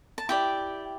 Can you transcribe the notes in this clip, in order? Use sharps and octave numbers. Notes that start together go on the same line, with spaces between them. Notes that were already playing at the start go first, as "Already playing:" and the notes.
A5
E4 G4 D5 G5